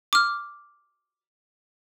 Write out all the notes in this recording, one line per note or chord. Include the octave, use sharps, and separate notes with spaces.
D6 F6